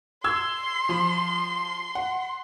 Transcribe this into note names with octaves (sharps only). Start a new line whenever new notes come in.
C6 E6 G#6
F3
F#5